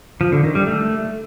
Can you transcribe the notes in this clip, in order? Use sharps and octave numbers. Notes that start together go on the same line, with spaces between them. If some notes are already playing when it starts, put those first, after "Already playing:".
F3
D3
D#3
G3
A3